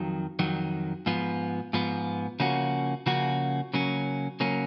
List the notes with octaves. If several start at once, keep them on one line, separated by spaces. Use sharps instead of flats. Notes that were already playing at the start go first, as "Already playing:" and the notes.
Already playing: F2 D#3 F#3
F2 D#3 F#3
G#2 F3 B3
G#2 F3 B3
C#3 F3 A#3 C#4 F#4
C#3 F3 A#3 C#4 F#4
C#3 F#3 A#3 C#4
C#3 F#3 A#3 C#4